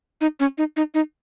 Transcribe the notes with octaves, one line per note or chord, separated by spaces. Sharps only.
D#4
C#4
D#4
D#4
D#4